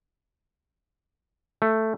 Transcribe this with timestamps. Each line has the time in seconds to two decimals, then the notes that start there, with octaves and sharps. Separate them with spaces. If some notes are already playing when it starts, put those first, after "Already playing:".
1.62 A3